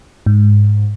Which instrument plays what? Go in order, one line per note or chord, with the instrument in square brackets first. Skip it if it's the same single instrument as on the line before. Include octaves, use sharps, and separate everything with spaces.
[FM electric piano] G#2